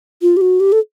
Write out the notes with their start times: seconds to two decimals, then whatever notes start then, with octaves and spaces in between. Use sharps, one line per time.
0.22 F4
0.37 G4
0.41 F#4
0.60 G4
0.72 A4